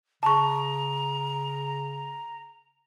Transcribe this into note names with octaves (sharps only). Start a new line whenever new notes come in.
C#3 A5 A#5 C#6